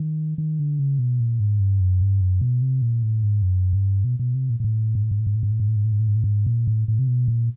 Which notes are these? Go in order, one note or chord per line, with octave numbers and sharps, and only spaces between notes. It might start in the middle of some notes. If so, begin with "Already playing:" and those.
Already playing: D#3
D#3
D3
C#3
B2
A#2
G#2
G2
F#2
G2
F#2
B2
C3
A#2
A2
G#2
F#2
G2
B2
B2
C3
A#2
A#2
A2
G#2
A2
G#2
A2
G#2
A2
G#2
A2
G#2
A2
G#2
A2
G#2
A2
G#2
A2
G#2
A#2
A2
A2
C3
B2
A#2